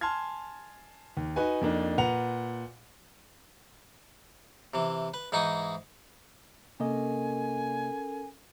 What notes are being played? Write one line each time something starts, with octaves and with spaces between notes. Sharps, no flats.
G#5 A5 C6 F6 G#6
D#2
D#4 F#4 B4 G#5
F2 A#3 D4 D#4
A#2 B4 F#5 A#5 F7
C3 E3
B4
G#2 E3 D#4 G#5 C#6 D#6
C3 A#3 C#4 A4 A#4 D#5 G#5